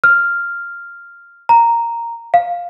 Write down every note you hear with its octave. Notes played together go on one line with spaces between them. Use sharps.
F6
A#5
F5